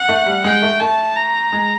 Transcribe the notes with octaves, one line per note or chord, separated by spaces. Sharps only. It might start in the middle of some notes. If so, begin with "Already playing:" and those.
Already playing: F#5
A3
G3
G#3 G5
A3
A3 A5
A#5
G#3